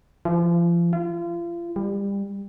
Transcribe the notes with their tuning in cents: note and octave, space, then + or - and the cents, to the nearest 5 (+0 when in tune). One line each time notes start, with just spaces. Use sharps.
F3 -35
F4 -35
G3 +25